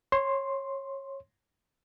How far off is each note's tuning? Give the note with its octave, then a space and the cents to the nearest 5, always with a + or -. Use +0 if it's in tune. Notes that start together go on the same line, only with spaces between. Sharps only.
C#5 -20 C6 +0